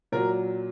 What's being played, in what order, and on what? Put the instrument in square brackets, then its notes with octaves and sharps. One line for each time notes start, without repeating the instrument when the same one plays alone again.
[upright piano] A#2 F#3 A#4